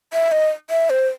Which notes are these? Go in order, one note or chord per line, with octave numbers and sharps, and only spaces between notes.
E5
D#5
E5
C5